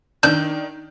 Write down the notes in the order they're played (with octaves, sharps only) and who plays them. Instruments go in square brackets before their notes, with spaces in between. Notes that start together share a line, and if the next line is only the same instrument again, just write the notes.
[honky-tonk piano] D#3 D4 [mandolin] G6